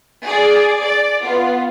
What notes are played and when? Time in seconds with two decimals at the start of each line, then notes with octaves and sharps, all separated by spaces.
0.25 G#4 D5
0.79 D5
1.24 B3 F4